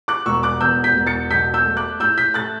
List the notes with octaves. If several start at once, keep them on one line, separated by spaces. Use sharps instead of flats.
D6 F#6
E1 C#6 E6
D6 F#6
E2 E6 G6
G6 B6
E1
A6 C#7
B1 G6 B6
E6 G6
A3
D6 F#6
A2 E6 G6
G6 B6
A3 F#6 A6